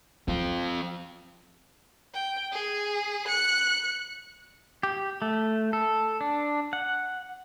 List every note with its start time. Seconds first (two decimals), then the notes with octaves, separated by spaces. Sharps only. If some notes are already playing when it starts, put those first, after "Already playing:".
0.28 F3 C4 F4
2.14 G5
2.52 G#4
3.28 F#6 C#7
4.83 G4
5.22 A3
5.73 A4
6.21 D4
6.73 F#5